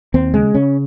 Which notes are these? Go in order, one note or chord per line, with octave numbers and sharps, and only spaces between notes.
D#2 C4
C#3 G#3
C#3 C#4